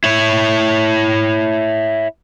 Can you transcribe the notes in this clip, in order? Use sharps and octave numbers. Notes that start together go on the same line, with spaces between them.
E4 C#5